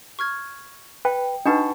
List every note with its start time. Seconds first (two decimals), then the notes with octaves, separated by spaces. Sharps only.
0.19 C#6 F6 G#6
1.05 B4 G5
1.46 D4 D#4 F#4 B4 F#5 A5 C#6 A6